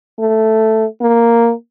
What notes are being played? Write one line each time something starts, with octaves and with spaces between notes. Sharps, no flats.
A3
A#3